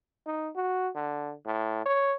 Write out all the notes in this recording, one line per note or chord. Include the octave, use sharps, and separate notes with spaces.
D#4
F#4
D3
A2
C#5